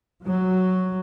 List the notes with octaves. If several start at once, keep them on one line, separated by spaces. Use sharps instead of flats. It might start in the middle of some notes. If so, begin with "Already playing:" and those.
F#3